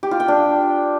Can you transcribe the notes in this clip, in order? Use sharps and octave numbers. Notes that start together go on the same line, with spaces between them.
G4
F4
G5
D4